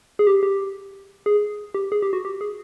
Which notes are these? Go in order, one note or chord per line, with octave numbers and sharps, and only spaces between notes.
G#4
G4
G4
G#4
G4
G#4
G4
F#4
G4
G#4